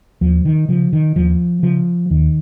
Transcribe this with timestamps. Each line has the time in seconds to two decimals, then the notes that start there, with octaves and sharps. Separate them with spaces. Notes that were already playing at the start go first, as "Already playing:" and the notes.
0.21 D#2 F3
0.45 D#3
0.69 C#3 F3
0.93 D#3
1.16 D#2 F3
1.63 C#3 F3
2.10 D#2 D#3